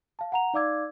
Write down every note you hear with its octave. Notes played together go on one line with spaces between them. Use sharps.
F5 A5
F#5 A#5 F7
D#4 D5 F5 D6 E6 G#6